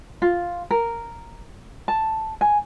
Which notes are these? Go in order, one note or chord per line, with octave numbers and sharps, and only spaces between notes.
F4
A#4
A5
G#5